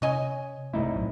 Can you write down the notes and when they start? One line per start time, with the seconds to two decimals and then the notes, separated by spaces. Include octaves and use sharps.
0.02 C3 C#4 C#5 D#5 G#5
0.73 C2 G#2 A3 A#3 D#4 E4
0.93 A#1 A2 F#3